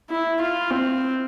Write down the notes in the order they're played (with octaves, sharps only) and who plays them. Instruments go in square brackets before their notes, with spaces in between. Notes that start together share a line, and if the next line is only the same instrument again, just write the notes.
[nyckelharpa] E4
F4
C4